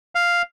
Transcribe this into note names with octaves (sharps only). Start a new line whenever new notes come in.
F5